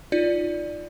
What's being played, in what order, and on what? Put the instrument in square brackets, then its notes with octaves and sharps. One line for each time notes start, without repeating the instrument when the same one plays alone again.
[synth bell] D#4 F4 D5